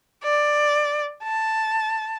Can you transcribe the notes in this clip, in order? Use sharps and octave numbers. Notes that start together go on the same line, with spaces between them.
D5
A5